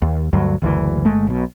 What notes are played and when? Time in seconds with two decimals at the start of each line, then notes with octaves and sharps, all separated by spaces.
0.02 D#2
0.33 D2 G2 F#3
0.62 F#1 D2 A#2 E3
1.05 G1 G#3 A3
1.27 B1 B2